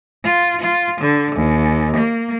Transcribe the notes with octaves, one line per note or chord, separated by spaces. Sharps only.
F4
F4
D3
D#2
A#3